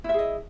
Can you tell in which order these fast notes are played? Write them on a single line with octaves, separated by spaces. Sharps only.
E4 E5 G#4 D#5